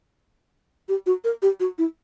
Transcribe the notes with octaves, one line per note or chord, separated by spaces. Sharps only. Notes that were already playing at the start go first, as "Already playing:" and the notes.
G4
F#4
A#4
G4
F#4
E4